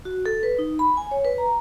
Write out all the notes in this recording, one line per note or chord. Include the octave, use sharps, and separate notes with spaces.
F#4
A4
B4
D#4
B5
G#5
C#5
B4
A#5